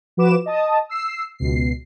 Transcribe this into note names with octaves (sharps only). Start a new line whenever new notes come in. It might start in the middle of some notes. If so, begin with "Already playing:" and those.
F3 F#4 B4 D6 E7
D#5 A5 D#6
E6 C7
C#2 B2 C7